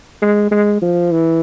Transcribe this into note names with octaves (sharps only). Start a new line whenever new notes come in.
G#3
G#3
F3
E3